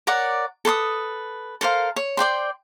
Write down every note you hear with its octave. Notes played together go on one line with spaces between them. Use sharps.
A#4 C#5 D5 F#5
A4 B4 C6 D#6
A4 A#4 C5 F5
C#5
C5 D5 G5 C6